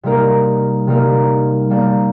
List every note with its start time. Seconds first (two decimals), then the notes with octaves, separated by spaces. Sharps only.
0.03 C3 G3 A#3 D#4 A#4
0.87 C3 G3 A#3 D#4 A#4
1.70 G3 A#3 D4 G4 D5